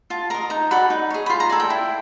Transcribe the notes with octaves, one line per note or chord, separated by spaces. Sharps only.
F4 A5
A#4 D#5 A#5
D#4 A#5
F#4 A4 D5 B5
D#4
G#4 C#5
B5
F4 C6
A#5
A4 D5 G#5
G5
E4